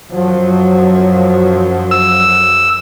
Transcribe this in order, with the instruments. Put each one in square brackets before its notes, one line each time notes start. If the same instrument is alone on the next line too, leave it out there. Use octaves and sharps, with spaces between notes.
[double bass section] F#2 F3 F#3
[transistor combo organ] E6